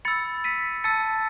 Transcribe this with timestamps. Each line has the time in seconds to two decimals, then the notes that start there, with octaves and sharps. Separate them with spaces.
0.05 B5 E6 A6 C#7
0.44 B6 D#7
0.84 A5 E6 A6 C#7